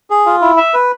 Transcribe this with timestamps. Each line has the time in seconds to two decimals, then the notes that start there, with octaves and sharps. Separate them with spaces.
0.10 G#4
0.26 F4
0.41 E4
0.57 E5
0.74 B4